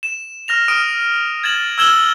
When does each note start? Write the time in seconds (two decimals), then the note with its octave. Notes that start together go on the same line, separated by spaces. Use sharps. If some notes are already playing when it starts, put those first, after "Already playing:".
0.03 E7
0.48 F6 A#6 F7
0.68 D#6 F6 D7 D#7
1.43 G#6 A6 E7 F#7
1.78 E6 F6 G#6 E7 F#7 G7